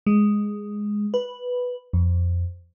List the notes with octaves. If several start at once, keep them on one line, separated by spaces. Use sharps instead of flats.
G#3
B4
F2